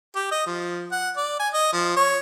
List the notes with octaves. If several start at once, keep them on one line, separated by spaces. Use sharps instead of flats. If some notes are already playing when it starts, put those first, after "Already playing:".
G4
D#5
F3
F#5
D5
G#5
D#5
F3
C#5